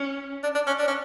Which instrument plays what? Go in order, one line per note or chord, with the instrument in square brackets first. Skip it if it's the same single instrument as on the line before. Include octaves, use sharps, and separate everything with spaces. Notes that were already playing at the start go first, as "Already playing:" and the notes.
Already playing: [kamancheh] C#4
[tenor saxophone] D4
D4
C#4
D4
C#4